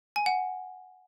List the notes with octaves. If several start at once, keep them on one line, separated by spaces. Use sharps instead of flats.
G#5
F#5